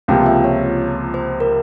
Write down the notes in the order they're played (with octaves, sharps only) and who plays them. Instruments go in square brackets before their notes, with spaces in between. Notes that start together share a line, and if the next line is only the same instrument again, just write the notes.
[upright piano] C#2 C3 F3 A#3 [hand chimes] G5
[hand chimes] E5
C#5
C5
A#4